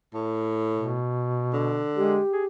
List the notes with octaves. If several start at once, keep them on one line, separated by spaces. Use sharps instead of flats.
A2
B2
D3
G#3 G4
G#4